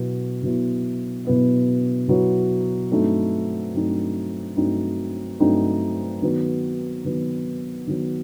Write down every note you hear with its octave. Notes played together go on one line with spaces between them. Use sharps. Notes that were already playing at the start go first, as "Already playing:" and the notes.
Already playing: B2 F#3 B3 E4
B2 F#3 B3 E4
B2 F#3 B3 E4
B2 F#3 B3 E4
G2 F#3 A3 C4 D#4
G2 F#3 A3 C4 D#4
G2 F#3 A3 C4 D#4
G2 F#3 A3 C4 D#4
D#3 F#3 B3
D#3 F#3 B3
D#3 F#3 B3